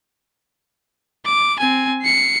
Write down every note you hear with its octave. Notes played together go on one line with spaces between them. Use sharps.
D6
C4 G#5
C7 C#7